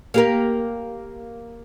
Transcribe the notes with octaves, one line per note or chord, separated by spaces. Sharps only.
A#3 G4 A#4